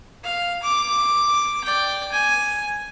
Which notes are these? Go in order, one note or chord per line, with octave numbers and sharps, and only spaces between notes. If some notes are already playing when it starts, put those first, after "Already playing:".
F5
D6
D5 G5
G#5